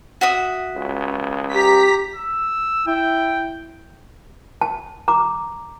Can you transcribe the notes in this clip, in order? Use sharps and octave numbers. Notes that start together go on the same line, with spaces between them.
F#4 E5 D#6
C#2
G4 A#5 B6
E6
E4 G5
A5
A#5 D6